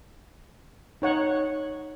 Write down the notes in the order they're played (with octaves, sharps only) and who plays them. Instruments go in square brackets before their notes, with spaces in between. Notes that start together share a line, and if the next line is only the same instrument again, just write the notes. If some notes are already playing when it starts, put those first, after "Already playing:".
[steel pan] D#4 C#5 F#5